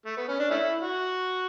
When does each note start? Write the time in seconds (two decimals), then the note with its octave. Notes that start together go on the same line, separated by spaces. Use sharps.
0.06 A3
0.17 B3
0.28 C#4
0.39 D4
0.51 A3 C#4 E4
0.81 F#4